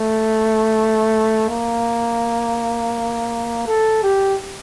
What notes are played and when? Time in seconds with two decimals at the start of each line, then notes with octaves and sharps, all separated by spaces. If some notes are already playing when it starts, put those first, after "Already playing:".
Already playing: A3
1.49 A#3
3.67 A4
4.03 G4